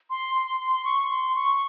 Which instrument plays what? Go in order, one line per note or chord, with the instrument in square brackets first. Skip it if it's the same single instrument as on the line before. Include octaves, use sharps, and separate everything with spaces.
[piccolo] C6
C6
C6
C6
C#6
C6
C#6